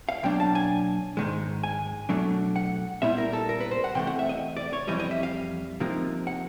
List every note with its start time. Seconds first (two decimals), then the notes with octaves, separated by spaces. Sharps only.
0.09 F5
0.23 B2 F#3 A#3 D4 G5
0.40 A5
0.55 G#5
1.17 G#2 D#3 G#3
1.63 G#5
2.09 B2 F#3 A3 D4
2.56 F#5
3.02 A#2 G3 B3 E4 E5
3.18 A#4
3.33 A4
3.49 A#4
3.60 B4
3.71 C5
3.84 F#5
3.95 C3 E3 A3 G5
4.07 F#5
4.19 E5
4.29 D#5
4.57 D5
4.73 C#5
4.87 F2 C#3 E3 G3 D#5
5.00 D#5
5.11 E5
5.23 F5
5.80 C3 F3 A#3 D#4
6.27 F#5